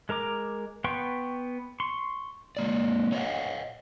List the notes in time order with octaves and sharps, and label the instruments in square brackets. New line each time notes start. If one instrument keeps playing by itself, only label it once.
[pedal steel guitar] G#3 A#4 A#5 D6
B3 B4 G5 C6 C#6
C6 C#6
[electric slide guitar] G#3 A#3 D5
C#5 D#5 F5 F#5